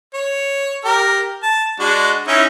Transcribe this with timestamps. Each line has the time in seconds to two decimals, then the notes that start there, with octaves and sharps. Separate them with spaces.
0.14 C#5
0.85 G4 A#4
1.43 A5
1.80 G#3 D4 F#4
2.28 C#4 D#4 E4